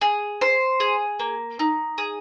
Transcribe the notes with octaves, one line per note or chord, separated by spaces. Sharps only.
G#4
C5
G#4
A#3
D#4
G#4